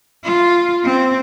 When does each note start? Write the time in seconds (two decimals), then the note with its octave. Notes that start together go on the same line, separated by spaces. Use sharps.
0.24 F4
0.84 C4